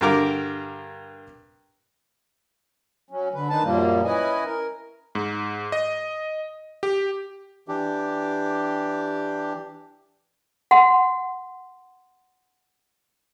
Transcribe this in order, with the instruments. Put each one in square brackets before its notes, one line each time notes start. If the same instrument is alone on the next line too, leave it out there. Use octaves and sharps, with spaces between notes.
[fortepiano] G2 D3 G4 A#4 D6
[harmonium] F#3 C#4
D3 B4
D#3 D4 D#4 B4 A5
F#2 A#2 F3 G3 A#3
C#4 E4 B4 D#5 G#5
A#4
[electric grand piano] G#2
D#5
G4
[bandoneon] E3 D4 G4
[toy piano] F#5 C6